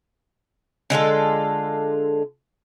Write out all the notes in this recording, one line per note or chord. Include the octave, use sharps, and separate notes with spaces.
D3 G#3 F4 A4